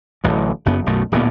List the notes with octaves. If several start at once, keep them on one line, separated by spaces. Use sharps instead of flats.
D1 A1 F#2
F#1 F#2 B3
B1 F#2 B2 A3
D1 D2 A#2 B3